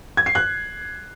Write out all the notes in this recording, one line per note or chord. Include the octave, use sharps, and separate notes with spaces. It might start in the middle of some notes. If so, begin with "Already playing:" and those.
G#6
C7
F#6